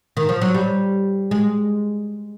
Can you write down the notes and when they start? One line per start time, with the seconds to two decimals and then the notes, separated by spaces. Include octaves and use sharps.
0.17 D#3
0.29 F3
0.41 F#3
0.54 G3
1.31 G#3